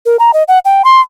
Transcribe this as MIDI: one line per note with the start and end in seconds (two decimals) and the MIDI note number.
0.06 0.16 70
0.19 0.31 82
0.34 0.43 75
0.48 0.59 78
0.65 0.82 79
0.85 1.00 84